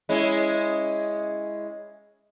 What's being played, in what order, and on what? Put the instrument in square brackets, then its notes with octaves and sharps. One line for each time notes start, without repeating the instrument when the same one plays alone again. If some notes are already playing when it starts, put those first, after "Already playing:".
[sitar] G#3 C#4 E4